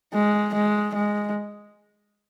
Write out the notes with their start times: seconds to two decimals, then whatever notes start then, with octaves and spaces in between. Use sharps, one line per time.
0.14 G#3
0.54 G#3
0.95 G#3